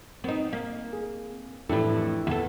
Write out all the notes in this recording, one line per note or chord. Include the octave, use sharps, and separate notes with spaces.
B3 C4 D#4 C5
A#3
G#4
F2 A2 E3 D4 E4 G4 A4
E2 E3 E4 A4